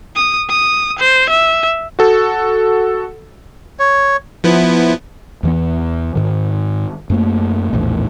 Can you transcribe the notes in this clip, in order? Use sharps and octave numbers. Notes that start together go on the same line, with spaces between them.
D#6
D#6
C5
E5
F#4 A4
C#5
F3 B3 E4
E2 E3 B3
G#2 D#3
F#2 A3 A#3
A#1 E2 A2